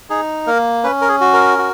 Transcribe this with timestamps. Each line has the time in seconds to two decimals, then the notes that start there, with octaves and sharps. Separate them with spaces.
0.10 D#4 G#4
0.47 A#3 A#4
0.84 C#4 B4
1.01 A#4
1.09 G#4
1.21 F#4
1.33 A#4
1.58 F#4